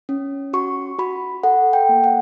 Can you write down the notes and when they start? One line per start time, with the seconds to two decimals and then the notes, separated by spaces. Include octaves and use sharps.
0.09 C#4
0.53 F#4 C#6
0.99 F#4 B5
1.43 A4 F#5
1.73 G5
1.89 A#3
2.04 F#5